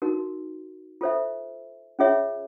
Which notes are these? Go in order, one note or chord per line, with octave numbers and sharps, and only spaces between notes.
D#4 F#4 A#4
F4 A4 C5 E5
C#4 F4 G#4 C#5 E5